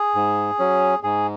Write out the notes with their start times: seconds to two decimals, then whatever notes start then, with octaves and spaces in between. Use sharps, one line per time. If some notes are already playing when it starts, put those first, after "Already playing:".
Already playing: G#4
0.15 G#2
0.59 F#3 C#4
1.03 G#2 G#4